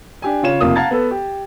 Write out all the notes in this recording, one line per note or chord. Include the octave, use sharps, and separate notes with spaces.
D4 G4 G#5
C#3 F4 C#5 E7
F1 C3 A#3 F4 D#6
F5 F#5 A5 A#5 G#6 A6
B3 A4 B4
G4